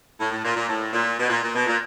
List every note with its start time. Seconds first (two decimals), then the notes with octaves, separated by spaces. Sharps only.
0.19 A2
0.31 A2
0.43 A#2
0.55 A#2
0.69 A2
0.93 A#2
1.18 B2
1.29 A#2
1.42 A#2
1.54 B2
1.66 A#2